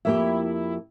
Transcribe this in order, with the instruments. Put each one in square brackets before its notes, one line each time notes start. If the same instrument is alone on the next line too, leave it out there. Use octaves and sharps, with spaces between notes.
[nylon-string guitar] F2 A#3 G4 [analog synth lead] E4